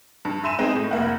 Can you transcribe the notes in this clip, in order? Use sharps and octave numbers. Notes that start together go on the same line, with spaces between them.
G2
E5 G#5 C6 D#7 E7
G#3 B3 C4 D#4 G#4 D#5
A2
F1 A#3 F#5